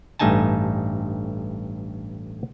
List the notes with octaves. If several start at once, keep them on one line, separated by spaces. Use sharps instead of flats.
A1 G2 A3 D#4 G#5 A5